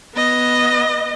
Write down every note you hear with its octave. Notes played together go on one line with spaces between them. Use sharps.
B3 D#5